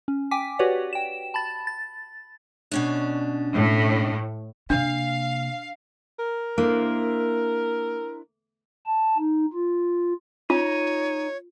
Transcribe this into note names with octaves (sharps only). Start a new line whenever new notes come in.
C#4
G5 G#5 D6 B6
F#4 G4 B4 C#5 D5 F#5
G5 E7
A5 B5 A6
A6
B2 C#4 D4
A2
C3 A#3 D4 F5
A#4
A#3 D4 E4 C5
A5
D#4
F4
D#4 F4 C#5